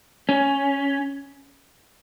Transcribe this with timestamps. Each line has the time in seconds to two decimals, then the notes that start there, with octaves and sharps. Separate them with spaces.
0.29 C#4